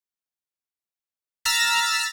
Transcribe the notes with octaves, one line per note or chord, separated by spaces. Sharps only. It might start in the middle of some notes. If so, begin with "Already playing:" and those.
A#5 E6 F6 A6 B6